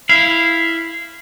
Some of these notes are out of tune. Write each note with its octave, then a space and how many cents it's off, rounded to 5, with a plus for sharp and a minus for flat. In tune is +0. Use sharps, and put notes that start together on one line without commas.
E4 +0 F5 -15